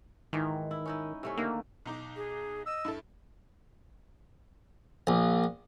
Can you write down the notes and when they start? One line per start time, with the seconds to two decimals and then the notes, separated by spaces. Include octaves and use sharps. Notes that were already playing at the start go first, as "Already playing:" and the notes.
0.33 G#2 D#3 E3
0.71 E4
0.86 C#4 D#4 E4
1.23 C3 A3 C#4
1.37 D3 D#3 A#3
1.86 B1 D#4 D6
2.16 G#4
2.66 D#5 E6
2.85 G2 E4 A4
5.07 A#1